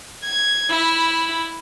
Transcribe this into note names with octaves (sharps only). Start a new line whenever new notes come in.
G#6
E4 B5